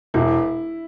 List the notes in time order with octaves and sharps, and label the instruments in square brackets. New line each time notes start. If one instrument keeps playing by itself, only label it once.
[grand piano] E1 [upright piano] E4